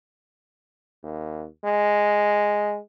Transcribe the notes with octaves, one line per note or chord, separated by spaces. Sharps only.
D#2
G#3